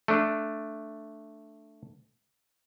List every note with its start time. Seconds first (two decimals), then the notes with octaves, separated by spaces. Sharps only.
0.08 A3 D4